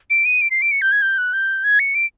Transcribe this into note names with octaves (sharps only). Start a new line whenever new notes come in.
D7
D#7
D7
C7
D7
C#7
G6
G#6
G6
F#6
G6
G#6
C#7
D7